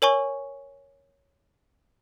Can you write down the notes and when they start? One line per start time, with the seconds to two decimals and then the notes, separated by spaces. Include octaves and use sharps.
0.02 A#4 C#5 G#5 C#6